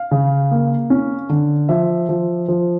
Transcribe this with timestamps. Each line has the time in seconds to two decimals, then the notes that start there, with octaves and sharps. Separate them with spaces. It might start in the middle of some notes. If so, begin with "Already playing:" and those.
Already playing: F5
0.11 C#3
0.51 A#3
0.90 C#4
1.29 D3
1.69 F3 E5
2.09 F3
2.48 F3